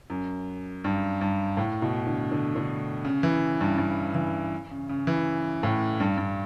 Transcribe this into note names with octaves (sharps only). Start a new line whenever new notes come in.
F#2
G2
G2
A2
B2
D3
D3
D3
C#3
E3
G2
G2
E3
C#3
C#3
E3
A2
G2
G2